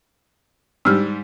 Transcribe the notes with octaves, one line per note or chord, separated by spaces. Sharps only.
G#2 G3 E6 F6